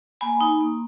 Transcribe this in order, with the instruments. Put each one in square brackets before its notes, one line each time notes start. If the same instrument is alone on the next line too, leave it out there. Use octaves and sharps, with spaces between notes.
[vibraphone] A#3 G#5 B5
D#4
A#3